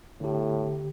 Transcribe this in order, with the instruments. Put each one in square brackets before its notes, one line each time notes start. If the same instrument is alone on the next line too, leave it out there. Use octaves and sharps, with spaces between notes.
[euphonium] A2 [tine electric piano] D3 G4